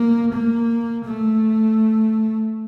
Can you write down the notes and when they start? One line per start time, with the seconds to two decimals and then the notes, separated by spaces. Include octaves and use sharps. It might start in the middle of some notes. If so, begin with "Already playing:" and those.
Already playing: A#3
0.32 A#3
1.05 A3